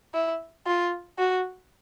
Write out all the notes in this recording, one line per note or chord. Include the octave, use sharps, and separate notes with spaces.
E4
F4
F#4